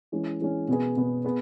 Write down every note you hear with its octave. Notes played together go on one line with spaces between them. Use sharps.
E3 G#3 C#4
E3 G#3 C#4
B2 B3 G#4
B2 B3 G#4
B3 G#4 B4